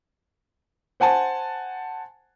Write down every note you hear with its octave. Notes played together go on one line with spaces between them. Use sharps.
C5 F#5 G#5 A5